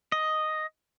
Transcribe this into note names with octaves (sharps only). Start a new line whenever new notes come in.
D#5